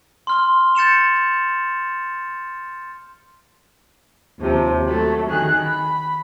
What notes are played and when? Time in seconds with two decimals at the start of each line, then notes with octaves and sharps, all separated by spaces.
0.27 C6 F6 G7
0.75 G6 A6 C#7 E7 F7
4.39 D#2 C3 F3
4.86 F#3 A3
5.29 D#3 G#4 F#6
5.64 B5